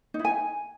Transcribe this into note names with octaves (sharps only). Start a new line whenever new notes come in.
D#4
E4
G#5